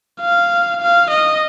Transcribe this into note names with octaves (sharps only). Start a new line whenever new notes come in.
F5
F5
D#5